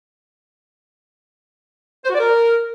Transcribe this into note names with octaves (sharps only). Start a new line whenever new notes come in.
C5
F#4
D5
A#4